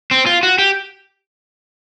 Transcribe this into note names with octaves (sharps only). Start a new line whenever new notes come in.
C4
F4
F#4
G4